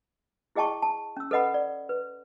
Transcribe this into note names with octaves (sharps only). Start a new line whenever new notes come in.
E4 G#4 D#5 G5 A5 C#6
A5
C#4 E6
A4 B4 D#5 F#5 B5
D5
B4